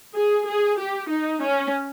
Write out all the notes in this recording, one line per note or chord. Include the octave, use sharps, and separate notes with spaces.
G#4
G#4
G4
D#4
C#4